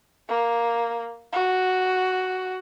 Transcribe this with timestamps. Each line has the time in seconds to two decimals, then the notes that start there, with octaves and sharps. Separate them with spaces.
0.29 A#3
1.33 F#4